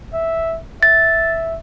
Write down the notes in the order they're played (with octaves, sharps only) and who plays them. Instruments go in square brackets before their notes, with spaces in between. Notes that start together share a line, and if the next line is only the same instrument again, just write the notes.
[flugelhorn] E5
[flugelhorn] E5 [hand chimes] A6